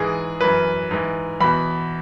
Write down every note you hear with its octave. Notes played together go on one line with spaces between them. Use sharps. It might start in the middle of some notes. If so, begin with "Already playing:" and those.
Already playing: G#2 E3 G#4
F#2 E3 B4
G#2 E3
E2 B2 B5